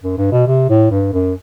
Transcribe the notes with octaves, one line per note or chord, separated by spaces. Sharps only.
F#2
G2
B2
C3
A2
G2
F#2